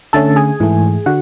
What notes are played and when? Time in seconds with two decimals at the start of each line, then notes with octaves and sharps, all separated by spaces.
0.13 D3 A3 C#4 A4 A5
0.36 G#4 G#5
0.60 G#2 E3 A3
1.06 D3 F#4 F#5